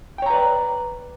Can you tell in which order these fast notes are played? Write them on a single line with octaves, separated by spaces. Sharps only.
G5 C#5 A#5 B4 D5